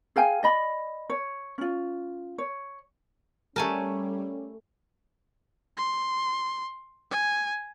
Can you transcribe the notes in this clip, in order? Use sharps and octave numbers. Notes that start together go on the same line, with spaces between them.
G#4 F5 G5 G#5
D5 D#5 B5
C#5
C#4 F4
C#5
G3 A3 C#4 A#4 C#5 G#5 A5
C6
G#5